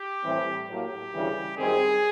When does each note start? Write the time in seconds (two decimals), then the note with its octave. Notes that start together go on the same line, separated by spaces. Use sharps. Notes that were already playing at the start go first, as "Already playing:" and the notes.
Already playing: G4
0.24 A2 E3 G3 C4
0.68 A2 F#3 A#3 G4
1.12 D2 C#3 E3 G3
1.57 F#2 D#3 G3 C4 G#4